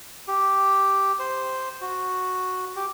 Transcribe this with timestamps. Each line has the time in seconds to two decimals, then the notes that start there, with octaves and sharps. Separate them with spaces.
0.28 G4
1.19 C5
1.81 F#4
2.76 G4